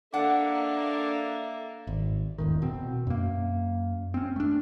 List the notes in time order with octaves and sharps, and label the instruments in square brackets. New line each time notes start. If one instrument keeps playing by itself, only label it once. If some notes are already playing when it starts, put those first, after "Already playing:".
[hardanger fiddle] A#3 E5 [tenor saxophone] D4 [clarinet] A4 [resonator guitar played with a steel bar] F#5
[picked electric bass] G#1
E1 A2 D#3
B2 C4
F#2 A#3
C4 C#4
A3 D4